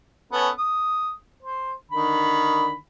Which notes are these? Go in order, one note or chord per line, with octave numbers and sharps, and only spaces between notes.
B3 C#4 A4
D#6
C5
D3 D#3 B5